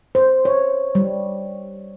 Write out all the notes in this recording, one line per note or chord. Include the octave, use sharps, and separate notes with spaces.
C5
C#5
G3